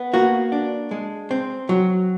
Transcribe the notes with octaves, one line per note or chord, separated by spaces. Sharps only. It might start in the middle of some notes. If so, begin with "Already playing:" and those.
Already playing: B3
A#3 F#4
D4
G#3
C4
F#3